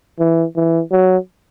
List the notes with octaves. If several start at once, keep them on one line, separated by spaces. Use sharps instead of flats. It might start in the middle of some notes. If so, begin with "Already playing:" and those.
E3
E3
F#3